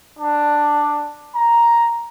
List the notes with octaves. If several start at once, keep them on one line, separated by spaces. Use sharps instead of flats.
D4
A#5